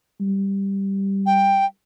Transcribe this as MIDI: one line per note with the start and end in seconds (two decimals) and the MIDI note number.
0.20 1.68 55
1.26 1.65 79